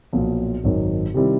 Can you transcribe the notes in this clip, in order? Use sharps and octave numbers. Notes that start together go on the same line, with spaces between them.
B1 A#2 F3
G#1 F#2 D#3
C3 D#3 G3 C4 E4